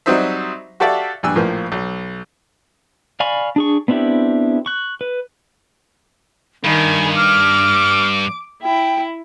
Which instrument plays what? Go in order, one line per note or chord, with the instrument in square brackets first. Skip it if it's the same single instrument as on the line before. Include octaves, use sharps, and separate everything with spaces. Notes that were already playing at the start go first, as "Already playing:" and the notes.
[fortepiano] F#3 G3 C4 D#4 C5 E5
F#4 G4 A4 D5 E5 F5
A#1 G2 G#5 E6
A#1 A2 F3 A#3
B1
[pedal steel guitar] D5 F5 G#5 B5 C#6
D4 G#4 C#6
B3 C4 D4 E4 G4
C#6 F#6
B4
[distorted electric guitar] G2 [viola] D#3 G#5 [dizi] B5
[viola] D6 [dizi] F6
[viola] E4 [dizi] G5